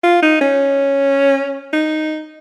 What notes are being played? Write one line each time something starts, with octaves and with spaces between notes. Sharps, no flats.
F4
D#4
C#4
D#4